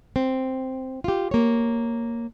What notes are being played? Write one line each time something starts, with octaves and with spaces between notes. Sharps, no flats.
C4
F4 G4
A#3 C#5